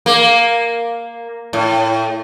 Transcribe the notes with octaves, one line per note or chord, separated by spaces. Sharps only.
A#3
A2